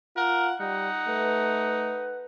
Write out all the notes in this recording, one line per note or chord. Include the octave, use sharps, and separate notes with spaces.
F4 A#4 F#5
G3 D#4 F#5
A3 B4